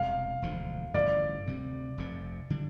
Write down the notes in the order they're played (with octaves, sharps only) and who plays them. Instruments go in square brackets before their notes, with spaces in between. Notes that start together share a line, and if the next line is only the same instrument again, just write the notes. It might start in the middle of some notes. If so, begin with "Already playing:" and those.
Already playing: [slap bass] E1 E2 C3 G3 [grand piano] F5
[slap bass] E1 D2 D3 F3
[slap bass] A1 G2 D3 F3 [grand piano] D5
[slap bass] D2 C3 G3
F1 F2 C3
D3 G3 D4